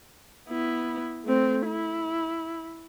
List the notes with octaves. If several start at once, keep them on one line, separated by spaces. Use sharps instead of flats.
B3 E4
A3 C4
E4